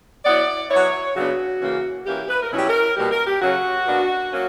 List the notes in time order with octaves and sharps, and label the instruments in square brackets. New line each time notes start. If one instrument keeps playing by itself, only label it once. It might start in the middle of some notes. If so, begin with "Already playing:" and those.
[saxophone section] F#3 B3 E4 D5
F#3 B3 E4 C#5
C#3 F#3 B3 D4 F#4
C#3 E3 A#3 C#4
E3 A#3 C#4 G4
B4
A#4
B2 F#3 C#4 E4 G4
A#4
B2 G3 A#3 G4
A#4
G4
C#3 F#3 C#4 F#4
B2 A#3 D4
F#3 A#3 C#4